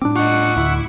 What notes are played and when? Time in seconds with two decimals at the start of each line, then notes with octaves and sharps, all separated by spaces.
0.02 A2 G3 C4 D4 D6
0.16 F4 D#5 F#5 C#6
0.57 D2 E4